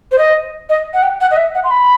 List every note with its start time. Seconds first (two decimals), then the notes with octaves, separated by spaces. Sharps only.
0.11 C5
0.18 D#5
0.69 D#5
0.94 F#5
1.03 G5
1.21 F#5
1.31 D#5
1.37 E5
1.55 F#5
1.64 C6
1.71 B5